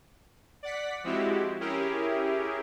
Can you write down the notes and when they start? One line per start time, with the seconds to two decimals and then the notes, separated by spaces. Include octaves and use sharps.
0.63 D5 F#5 B6
1.04 F3 G#3 C4 E4 F#4 G4
1.61 C#4 E4 G4 G#4 A#4